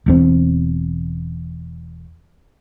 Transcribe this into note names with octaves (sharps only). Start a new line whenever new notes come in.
E1 E2 C4